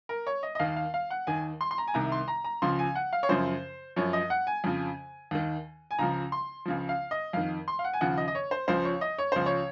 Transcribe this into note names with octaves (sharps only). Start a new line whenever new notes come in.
A#4
C#5
D#5
D#5
D#2 D#3 F5
F5
F5
F#5
D#2 D#3 G#5
C6
C6
A#5
G#5
C2 C3 D#3 A#5
C6
A#5
A#5
C#2 C#3 F3 C6
G#5
F#5
F5
C#5
F#2 C#3 F3 C5
F#2 F3 C#5
D#5
F#5
G#5
F2 C#3 F3
D#2 D#3
G#5
C#2 C#3 F3 A#5
C6
C#2 C#3 F3
F5
D#5
F2 D#3 F5
C6
F5
F#5
G#5
D#2 C#3 F3 F#5
D#5
D#5
C#5
C5
C#2 C#3 F3 C5
C#5
D#5
C#5
C#2 C#3 F3 C5
C#5